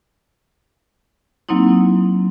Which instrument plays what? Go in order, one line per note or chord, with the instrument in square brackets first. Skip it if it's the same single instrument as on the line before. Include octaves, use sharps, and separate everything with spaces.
[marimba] F#3 A#3 C4 D#4 E4